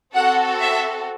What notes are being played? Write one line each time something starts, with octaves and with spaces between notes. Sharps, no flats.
C4 F#4 A4 F#5
E5